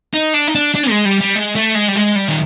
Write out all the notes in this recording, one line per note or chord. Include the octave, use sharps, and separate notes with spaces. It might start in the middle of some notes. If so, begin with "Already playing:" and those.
D#4
D4
D#4
D4
D4
G#3
G3
G3
G#3
A3
G#3
G3
G#3
G3
D#3